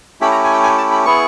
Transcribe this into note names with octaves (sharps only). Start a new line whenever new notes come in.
A3 C#4 E4 G4 B5
A#5
G#5
G5
G#5
A5
B5
B3 E4 G#4 C#6